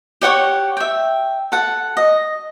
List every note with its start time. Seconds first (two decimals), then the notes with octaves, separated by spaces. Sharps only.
0.21 G4 C#5 F#5 C#6
0.77 E5 G5
1.52 A4 F#5
1.97 D#5